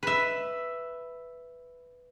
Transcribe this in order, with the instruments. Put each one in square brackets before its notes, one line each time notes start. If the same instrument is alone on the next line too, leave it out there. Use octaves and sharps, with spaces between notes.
[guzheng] B4 E5